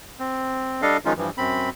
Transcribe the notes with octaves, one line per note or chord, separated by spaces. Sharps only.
C4
G3 D4 A4 D#5 F5
D#3 F3 G#3 C#4 D#4 F4
G2 E3 F3
F#2 C4 B5